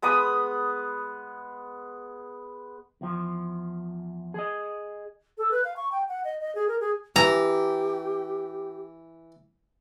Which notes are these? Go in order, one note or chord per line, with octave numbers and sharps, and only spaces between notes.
G#3 B3 B5 D#6
E2 F3
G#4 D#5
A4
B4
F5
C#6
G5
F#5
D#5
D#5
G#4
A#4
G#4
E3 G4 A#5